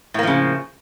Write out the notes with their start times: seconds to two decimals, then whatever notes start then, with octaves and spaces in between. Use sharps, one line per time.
0.14 A2
0.19 A#3
0.23 F3
0.27 C#3